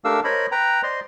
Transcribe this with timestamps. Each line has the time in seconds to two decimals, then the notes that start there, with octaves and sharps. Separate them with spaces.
0.04 A3 D4 G4 A#4 F5 E6
0.24 A#4 C5 C#5 D#5 B5
0.52 B4 G5 A#5
0.83 C5 D5 D#5 C6